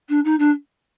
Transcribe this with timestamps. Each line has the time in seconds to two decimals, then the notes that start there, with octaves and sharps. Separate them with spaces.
0.09 D4
0.24 D#4
0.39 D4